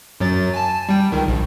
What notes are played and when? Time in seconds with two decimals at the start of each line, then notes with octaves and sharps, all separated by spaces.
0.20 F#2 F#3 A6
0.54 G#5 A5
0.89 G3 G5
1.12 C#2 D#3
1.28 A#1